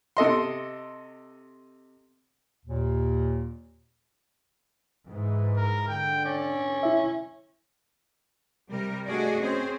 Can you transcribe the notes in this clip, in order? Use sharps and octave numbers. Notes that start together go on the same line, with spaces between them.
C3 A4 D#5 C6
D#2 A#2
G#2 E3
A#4
D3 G5
C#4 D5
E4 E5
C3 G3 A#4
A3 D4 F#4 G#4 D5 D#5
C4 C#4 G#4 C5